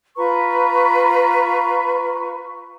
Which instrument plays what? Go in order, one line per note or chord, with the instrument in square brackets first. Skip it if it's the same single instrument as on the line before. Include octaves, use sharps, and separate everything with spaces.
[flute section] F4 B4 A#5 C#6